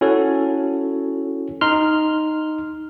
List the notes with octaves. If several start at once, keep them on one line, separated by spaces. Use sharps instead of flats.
C#4 E4 F#4 A4 C#5
D#4 C6 F6